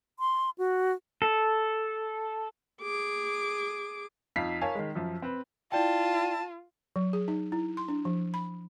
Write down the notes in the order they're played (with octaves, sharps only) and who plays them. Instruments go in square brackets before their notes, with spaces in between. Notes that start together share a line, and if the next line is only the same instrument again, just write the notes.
[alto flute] C6
F#4
[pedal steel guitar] A4
[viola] G#4 D6
[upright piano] F2 D#4 F5 B6 C7
A#4 C#5 F5 G#5 A5
D#3 G#3
F#2 F3
C4 B4
[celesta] E4 D5 G5 [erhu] F4 [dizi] A5
[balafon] F#3
G#4
D#4
E4
C6
D4
F3
B5